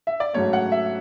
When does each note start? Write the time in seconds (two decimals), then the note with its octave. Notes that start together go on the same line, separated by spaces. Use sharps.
0.07 E5
0.20 D5
0.33 G#2 F#3 A3 C#4 C#5
0.53 F#5
0.72 E5